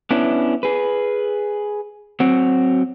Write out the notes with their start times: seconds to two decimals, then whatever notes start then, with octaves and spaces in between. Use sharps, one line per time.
0.11 B3 C#4 D4 E4
0.63 G#4 B4
2.20 F#3 C4 F#4